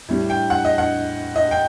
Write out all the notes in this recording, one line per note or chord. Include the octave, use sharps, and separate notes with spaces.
A2 G3
G5
F#5
D#5
F#5
D#5
G5